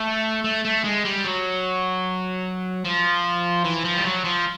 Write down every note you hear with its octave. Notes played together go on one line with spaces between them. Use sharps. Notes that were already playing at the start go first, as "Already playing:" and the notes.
Already playing: A3
A3
A3
G#3
G3
F#3
F3
E3
F3
G3
F#3
F3